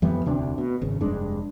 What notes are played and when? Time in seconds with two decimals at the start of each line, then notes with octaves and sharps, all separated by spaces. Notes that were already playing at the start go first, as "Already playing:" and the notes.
0.02 F2 E3 G3 B3
0.25 E1 D2 C3 D4
0.58 B2
0.82 G#1 C#3
1.00 F1 G2 G#3 D4